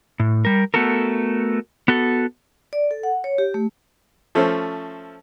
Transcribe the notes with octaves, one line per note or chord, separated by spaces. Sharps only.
A2
G3 A#4
A3 B3 F#4 A4 A#4
B3 F#4 A4
D5
A4
F#5
C#5
G4
A3
F3 A3 C#4 A4 C5